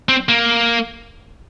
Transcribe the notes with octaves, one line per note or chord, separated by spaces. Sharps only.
C4
A#3